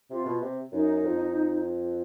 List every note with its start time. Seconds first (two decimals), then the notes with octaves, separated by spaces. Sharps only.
0.10 C3 F4
0.25 B2
0.41 C3
0.72 F#2 D#4
1.03 F2